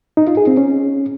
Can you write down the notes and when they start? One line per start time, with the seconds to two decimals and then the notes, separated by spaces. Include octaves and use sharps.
0.17 D#4
0.27 F4
0.37 G#4
0.47 C4
0.57 C#4